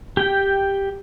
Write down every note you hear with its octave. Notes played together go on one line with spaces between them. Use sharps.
G4 G5